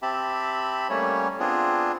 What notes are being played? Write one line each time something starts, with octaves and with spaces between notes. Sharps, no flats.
C4 G4 E5 A5 B5
G3 A3 A#3 C#4 C#5
B3 C4 D4 F4 G#4